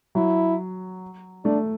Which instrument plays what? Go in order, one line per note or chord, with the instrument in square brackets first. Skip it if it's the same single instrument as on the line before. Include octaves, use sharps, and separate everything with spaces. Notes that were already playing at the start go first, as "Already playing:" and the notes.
[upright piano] F#3 [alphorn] E4
[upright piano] A3 [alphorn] D4